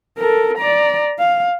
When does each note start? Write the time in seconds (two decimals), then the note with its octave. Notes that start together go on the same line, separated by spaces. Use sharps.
0.18 A4 A#4
0.58 D5 A#5
1.19 F5